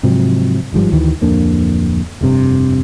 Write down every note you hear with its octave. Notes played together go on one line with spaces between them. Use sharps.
G#2 C3 F3 F#3
G1 G#2 F3 G3
D2 D#3 E3
D1 F2 A#3 D4
F1 G2 C3